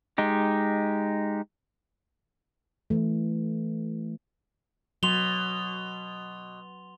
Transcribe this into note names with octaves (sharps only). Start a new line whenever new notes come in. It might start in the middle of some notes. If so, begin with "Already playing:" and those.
G#3 D#4 G4
E3 A3
B2 F#3 C6 F7 G7